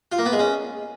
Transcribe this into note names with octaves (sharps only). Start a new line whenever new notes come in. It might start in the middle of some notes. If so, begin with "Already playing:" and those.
F4
A#3
B3
G#3
C#4